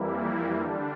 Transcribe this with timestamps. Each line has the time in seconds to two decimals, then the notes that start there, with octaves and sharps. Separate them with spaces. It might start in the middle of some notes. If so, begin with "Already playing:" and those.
Already playing: F2 E3 G3 A#3 E4
0.60 D3 G3 D4